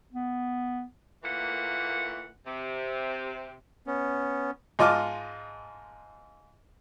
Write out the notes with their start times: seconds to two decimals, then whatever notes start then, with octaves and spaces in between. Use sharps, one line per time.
0.13 B3
1.24 A#2 E3 A3 A#3 F#5
2.46 C3
3.87 B3 C#4
4.79 G#2 F4 D#5 A5 D6 F6